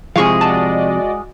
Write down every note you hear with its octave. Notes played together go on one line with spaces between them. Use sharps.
C3 F3 G#3 E4 G#4 F5 G#5 C#6
F#4 D5 D#5 A5